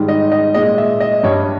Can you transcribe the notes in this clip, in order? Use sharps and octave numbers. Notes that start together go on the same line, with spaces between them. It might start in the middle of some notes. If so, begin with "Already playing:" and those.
Already playing: G#2 D#3 G3
D#5
D#5
A#2 G#3 D#5
E5
D#5
G2 G3 C#5